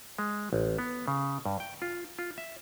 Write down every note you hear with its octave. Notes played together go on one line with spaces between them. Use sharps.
G#3
A1
B3
C#3
G2
G5
F4
F4
E5